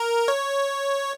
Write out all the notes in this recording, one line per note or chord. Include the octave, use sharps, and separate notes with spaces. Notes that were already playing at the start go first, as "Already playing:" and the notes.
Already playing: A#4
C#5